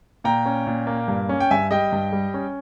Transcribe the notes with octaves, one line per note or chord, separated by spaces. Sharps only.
A#2 G5 A#5
C#4
A#2
A#3
G2
C#4
G5
G2 E5 G#5
G3 D#5 G5
G2
G3
C#4